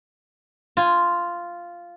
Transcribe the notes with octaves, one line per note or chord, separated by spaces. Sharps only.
F4 G#5